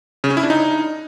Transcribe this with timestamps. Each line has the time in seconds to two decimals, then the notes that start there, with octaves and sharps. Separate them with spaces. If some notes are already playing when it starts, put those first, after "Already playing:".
0.24 C#3
0.30 C#4
0.37 E4
0.43 D4
0.50 D#4